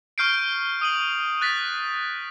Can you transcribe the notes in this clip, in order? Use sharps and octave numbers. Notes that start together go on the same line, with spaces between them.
C#6 F6 G6 C7 D7
D#6 D#7 F#7
F#6 A6 B6